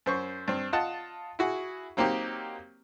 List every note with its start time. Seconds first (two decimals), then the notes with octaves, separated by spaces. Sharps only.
0.06 F#2 C5 C#6
0.48 G2 C4
0.73 F4 D#5 F#5 A5
1.39 E4 F#4 G#4
1.97 F#3 A#3 C4 D#4 G4